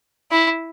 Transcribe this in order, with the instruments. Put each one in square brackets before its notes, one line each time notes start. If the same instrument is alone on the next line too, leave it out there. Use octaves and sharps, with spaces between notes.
[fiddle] E4